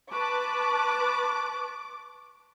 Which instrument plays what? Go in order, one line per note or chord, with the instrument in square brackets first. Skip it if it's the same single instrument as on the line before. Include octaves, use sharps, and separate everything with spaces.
[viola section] B4 A5 [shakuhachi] C#6 [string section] D6